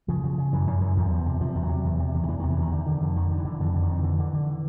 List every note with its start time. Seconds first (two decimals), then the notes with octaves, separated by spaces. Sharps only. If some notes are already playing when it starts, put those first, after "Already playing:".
0.08 C#3 F3
0.24 C#3
0.38 C#3
0.53 F#2 E3
0.67 F#2
0.81 F#2
0.97 E2 F3
1.10 E2
1.26 C3
1.41 C3 F3
1.55 E2
1.63 F#3
1.69 C3
1.85 E2
2.00 C3
2.14 E2
2.23 D#3
2.28 E2 E3
2.40 C3 D#3
2.50 E3
2.57 E2 D#3
2.72 D3
2.87 D3
3.02 F2
3.16 D3 D#3
3.31 D3
3.38 E3
3.45 D3
3.60 F2 D3
3.75 D3
3.82 D#3
3.89 F2
4.03 D3 E3
4.19 D3
4.34 D3